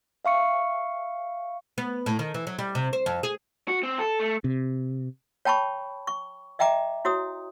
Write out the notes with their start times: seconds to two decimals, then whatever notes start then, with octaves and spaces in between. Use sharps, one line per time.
0.25 E5 F5 C#6 C#7
1.78 B3
2.06 A2
2.19 D#3
2.34 E3
2.47 F#3
2.59 G3
2.75 C3
2.93 C5
3.06 F2
3.23 G#4
3.68 F#4
3.83 C4
3.99 A4
4.20 A3
4.44 C3
5.45 C#5 G5 A5 B5 C#6
6.07 C#6
6.59 D#5 E5 G5 A#5 D6
7.05 E4 F#4 C#5 D#6